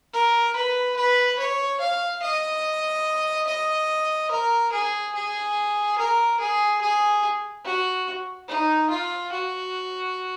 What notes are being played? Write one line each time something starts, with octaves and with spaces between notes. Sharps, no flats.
A#4
B4
B4
C#5
F5
D#5
D#5
A#4
G#4
G#4
A#4
G#4
G#4
F#4
D#4
F4
F#4